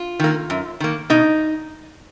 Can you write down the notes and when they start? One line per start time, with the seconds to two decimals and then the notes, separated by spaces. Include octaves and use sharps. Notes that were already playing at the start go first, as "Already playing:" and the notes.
Already playing: F4
0.19 D#3 A#3
0.50 F#2
0.80 D#3 A#3
1.10 B2 D#4